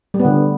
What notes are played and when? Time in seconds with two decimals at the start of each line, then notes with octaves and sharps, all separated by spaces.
0.14 G3
0.20 B3
0.25 D3